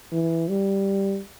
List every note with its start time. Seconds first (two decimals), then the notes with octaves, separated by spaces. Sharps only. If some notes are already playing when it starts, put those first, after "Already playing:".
0.12 E3
0.49 G3